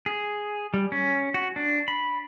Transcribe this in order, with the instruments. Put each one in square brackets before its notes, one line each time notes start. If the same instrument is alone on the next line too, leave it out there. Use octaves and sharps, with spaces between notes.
[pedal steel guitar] G#4
G3
C#4
F#4
D4
B5